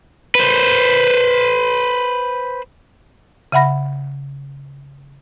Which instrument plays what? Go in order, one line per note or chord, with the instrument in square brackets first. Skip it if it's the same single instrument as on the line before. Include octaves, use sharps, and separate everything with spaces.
[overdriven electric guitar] B4 C5
[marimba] C#3 E5 F#5 B5 A#6